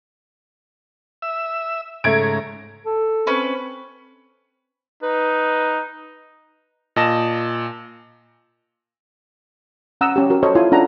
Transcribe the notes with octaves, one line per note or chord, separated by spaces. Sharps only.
E5 E6
G#2 C#3 A3 A#5 G#6 D7
A4
C4 C#4 B4
D#4 B4
A#2 D#5 A5 A#6 E7
C#4 F#5 A#5 D#6 E6
C#4 G4
F#4 A#4
A4 C5 C#5 D#5
E4 F4 G#5 C6
C#4 D4 F4 A4 F#5 A#5